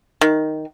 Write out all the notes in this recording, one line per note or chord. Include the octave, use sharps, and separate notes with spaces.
D#3